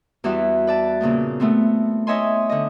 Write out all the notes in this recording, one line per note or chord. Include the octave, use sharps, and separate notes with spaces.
E2 E3 G3 E4 F#4 E5
B4 D5 A5
A#2 C#3 A#3 B3
A3 B3 C4
D#4 C#5 D#5 E5 G#5 C6
D3 D#5